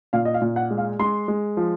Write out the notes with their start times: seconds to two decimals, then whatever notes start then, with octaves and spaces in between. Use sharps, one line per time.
0.13 A#2 F5
0.25 D#5
0.34 F5
0.41 A#2
0.56 F#5
0.71 G#3
0.78 F5
0.99 G#3 C6
1.28 G#3
1.57 F3